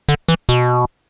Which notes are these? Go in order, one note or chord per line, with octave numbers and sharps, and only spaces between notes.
D3
E3
B2